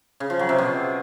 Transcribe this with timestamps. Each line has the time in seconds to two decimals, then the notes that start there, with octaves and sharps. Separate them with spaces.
0.20 C#3
0.30 F3
0.39 F#3
0.49 C3
0.58 B2